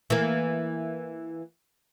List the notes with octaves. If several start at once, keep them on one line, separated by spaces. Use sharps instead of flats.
E3 A#3